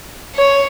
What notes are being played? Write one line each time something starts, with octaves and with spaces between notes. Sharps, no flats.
C#5